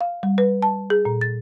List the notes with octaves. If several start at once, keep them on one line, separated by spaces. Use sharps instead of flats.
F5
G3
B4
A5
G#4
A#2
A6